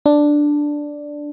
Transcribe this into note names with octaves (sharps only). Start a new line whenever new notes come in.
D4